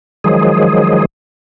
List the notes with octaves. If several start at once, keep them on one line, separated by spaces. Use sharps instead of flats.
D#3 F3 F#3 G#3 G#4